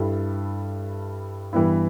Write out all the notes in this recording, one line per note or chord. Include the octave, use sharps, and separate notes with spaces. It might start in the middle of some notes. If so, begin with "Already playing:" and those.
Already playing: G2 G3 E4 A4
G2 E3 G3 B3 E4